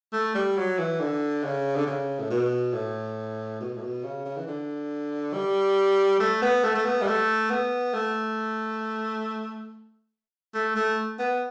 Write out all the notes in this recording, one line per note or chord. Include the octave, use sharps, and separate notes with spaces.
A3
G3
F#3
E3
D3
C#3
D3
C#3
A2
B2
A2
B2
A2
B2
C#3
C#3
E3
D3
G3
A3
B3
A3
A3
B3
G3
A3
B3
A3
A3
A3
B3